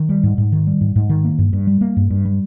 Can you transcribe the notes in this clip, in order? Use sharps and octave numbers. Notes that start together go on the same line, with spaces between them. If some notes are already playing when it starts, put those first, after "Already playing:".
Already playing: D#3
G3
G#2
G#2
D#3
G3
G#2
G#2
D#3
A#3
G2
G2
G3
A#3
G2
G2
G3